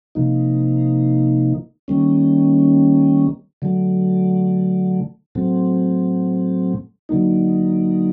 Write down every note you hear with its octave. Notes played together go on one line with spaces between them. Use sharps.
C3 F3 A#3 D#4
D#3 G3 A#3 C#4
D3 F#3 A3
A2 F#3 A3 C4
D3 F#3 A#3 D#4